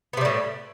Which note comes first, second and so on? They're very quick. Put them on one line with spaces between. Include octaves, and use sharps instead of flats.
B3 C3 G3 A2